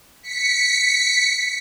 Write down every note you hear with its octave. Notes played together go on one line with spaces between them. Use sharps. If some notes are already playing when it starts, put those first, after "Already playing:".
B6 C#7